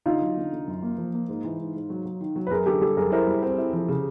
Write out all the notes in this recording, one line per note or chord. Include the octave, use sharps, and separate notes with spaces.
D3 D#4 F4
F#3
D3
D3
F#2
A#3
F3
A#3
G#2
E3
G#2
G#2
F#3
F#3
D#3
F#3
B4
F#2 G#4 A#4
D3 G4 A4
G3 G4 A4
F#2 G#4 A#4
E4 A#4 C5
G3
C4
E4
F3
C#3